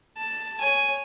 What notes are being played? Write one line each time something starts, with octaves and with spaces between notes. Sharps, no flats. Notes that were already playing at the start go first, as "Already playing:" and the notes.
A5
C#5 G#5